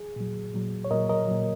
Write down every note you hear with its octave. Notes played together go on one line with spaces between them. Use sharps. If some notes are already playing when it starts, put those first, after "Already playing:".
Already playing: G#4
A#2 F#3
A#2 F#3
C#5
A#2 F#3 A#4 D#5
A#4 D#5
A#2 F#3